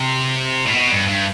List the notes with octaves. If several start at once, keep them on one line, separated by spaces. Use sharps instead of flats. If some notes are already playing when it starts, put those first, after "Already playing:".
Already playing: C3
A2
B2
G2
G2